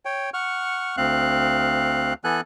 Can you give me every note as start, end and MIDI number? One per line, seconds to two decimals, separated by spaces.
0.05 0.30 73
0.05 0.30 79
0.34 0.96 78
0.34 0.96 85
0.34 0.96 89
0.97 2.14 38
0.97 2.14 60
0.97 2.14 77
0.97 2.14 90
2.24 2.41 52
2.24 2.41 59
2.24 2.41 69
2.24 2.41 80
2.24 2.41 90